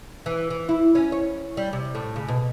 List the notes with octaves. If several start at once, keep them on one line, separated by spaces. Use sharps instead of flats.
E3
E3
E4
C#4
C#5
G3
C3
A2
C#3
B2